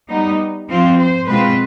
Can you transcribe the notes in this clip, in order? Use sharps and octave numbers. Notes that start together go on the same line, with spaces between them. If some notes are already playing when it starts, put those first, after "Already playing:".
G3 B3 D#4
F3 C4 F4
C5
B2 G#3 C4 F4 B4